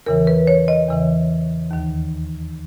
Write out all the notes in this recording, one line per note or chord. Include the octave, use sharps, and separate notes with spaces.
E2 C#3 E3 A#4
B4
C#5
D#5
E2 C#3 E3
D#2 D#3